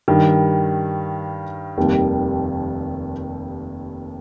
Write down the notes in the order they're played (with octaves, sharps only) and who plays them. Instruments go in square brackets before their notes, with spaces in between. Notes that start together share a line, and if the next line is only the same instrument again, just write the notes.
[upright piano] G2 D#3 G3
F1 D#2 D#3 G3